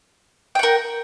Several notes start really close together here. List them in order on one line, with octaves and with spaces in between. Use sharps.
G5 F#5 A#4